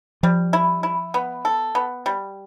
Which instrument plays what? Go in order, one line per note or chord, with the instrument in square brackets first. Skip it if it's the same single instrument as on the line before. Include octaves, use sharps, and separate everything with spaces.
[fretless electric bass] F3 [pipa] G3
[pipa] E4
E4
B3
A4
B3
G3